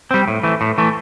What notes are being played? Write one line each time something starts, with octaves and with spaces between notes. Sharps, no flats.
G3 C4
A2
E3 A3
A2
E3 A3